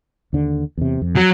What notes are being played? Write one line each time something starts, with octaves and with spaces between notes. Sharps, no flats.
D#2 D3
E2 C3
F2
F#3